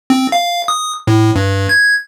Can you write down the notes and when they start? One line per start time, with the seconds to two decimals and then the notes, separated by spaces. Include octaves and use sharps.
0.10 C4
0.32 F5
0.68 D#6
1.07 A2
1.36 G2
1.69 G#6